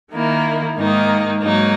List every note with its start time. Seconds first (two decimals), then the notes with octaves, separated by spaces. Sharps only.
0.12 D#3 A#3 E4
0.77 G#2 D#3 A#3 D#4
1.42 G#2 F#3 A#3 D#4